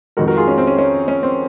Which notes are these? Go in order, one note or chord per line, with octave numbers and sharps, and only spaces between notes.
F2 D#3 G#3 F#4 A#4
F#4 A#4
F4 G#4
C#4
C4
C#4
C#4
C#4
C4